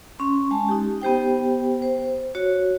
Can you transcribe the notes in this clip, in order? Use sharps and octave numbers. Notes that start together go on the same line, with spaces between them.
C#4 C6
G#3 A5
D#4 G4
B3 G4 C5 G5
C5
F#4 C#5